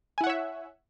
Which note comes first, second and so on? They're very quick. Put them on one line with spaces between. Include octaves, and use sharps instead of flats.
G#5 E4 F#5 C#5 E5